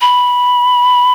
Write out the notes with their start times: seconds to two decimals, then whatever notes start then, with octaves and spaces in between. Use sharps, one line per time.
0.01 B5